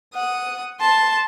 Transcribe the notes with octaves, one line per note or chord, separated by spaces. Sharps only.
F#5 D#6
A5 C6